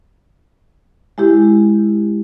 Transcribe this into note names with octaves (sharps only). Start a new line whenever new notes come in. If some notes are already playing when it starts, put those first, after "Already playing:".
G#3 E4 G4